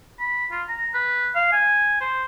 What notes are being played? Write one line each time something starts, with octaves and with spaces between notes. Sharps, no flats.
B5
F4
A#5
B4
F5
G#5
C5